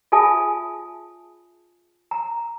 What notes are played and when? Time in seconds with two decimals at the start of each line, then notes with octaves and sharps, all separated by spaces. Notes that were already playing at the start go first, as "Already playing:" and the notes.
0.12 F4 G#4 E5 G#5 A5 D#6
2.11 A#5